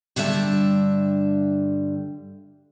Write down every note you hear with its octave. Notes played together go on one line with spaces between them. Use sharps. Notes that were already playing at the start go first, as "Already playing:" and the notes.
G2 D3 G3 E5 A5